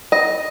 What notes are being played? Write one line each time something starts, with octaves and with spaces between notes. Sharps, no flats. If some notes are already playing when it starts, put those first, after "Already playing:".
D#5